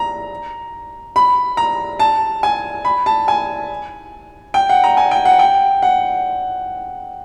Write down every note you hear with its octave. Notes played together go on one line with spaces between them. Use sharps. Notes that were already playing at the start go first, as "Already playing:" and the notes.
Already playing: A#5
B5
A#5
A5
G#5
B5
A5
G#5
G5
F#5
A#5
G#5
G5
F#5
G5
F#5